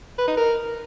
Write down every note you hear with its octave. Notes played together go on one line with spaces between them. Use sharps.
B4
D#4
A#4